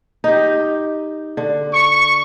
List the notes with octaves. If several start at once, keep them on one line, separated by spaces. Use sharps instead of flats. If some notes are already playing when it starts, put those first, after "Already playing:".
D#4 G4
D3
C#6